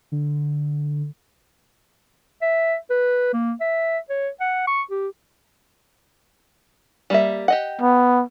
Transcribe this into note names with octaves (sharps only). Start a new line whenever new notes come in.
D3
E5
B4
A#3
E5
C#5
F#5
C#6
G4
G3 A#3 E5
G4 D#5 F#5
B3